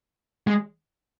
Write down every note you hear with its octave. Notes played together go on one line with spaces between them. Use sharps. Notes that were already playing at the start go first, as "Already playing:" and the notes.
G#3